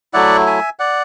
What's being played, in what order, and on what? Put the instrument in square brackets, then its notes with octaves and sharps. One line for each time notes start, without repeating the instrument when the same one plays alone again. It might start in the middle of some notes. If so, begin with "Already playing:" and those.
[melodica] F#3 A3 E4 D5 F#5
E5 G#5
D5 F#5